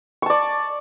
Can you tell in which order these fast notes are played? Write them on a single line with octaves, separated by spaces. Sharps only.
C#6 A5 D5